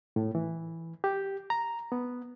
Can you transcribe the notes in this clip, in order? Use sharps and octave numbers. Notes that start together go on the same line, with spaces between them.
A2
E3
G4
A#5
B3